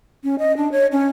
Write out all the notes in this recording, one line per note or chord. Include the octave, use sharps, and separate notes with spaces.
C#4
D#5
D4
C#5
C#4